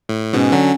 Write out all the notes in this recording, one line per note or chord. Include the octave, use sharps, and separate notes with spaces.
A2
G#2 B2 C#4
D3 F#3